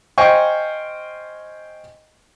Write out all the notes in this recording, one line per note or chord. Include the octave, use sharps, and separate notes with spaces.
C5 D#5 F5 G5 G#5 C#6